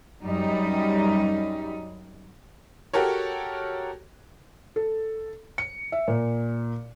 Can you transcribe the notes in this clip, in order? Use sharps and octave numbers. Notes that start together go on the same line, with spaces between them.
F#2 G3 D#4
F#4 G4 A4 A#4 C#5
A4
C#7
E5
A#2